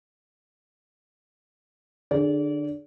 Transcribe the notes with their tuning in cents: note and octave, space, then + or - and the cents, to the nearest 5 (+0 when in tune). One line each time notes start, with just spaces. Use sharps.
D3 +25 G#4 +5 D5 -30